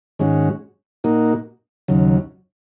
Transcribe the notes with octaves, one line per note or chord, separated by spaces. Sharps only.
G#2 D#3 G#3 C#4 F#4
A#2 A#3 D#4 F#4
D#2 C#3 F#3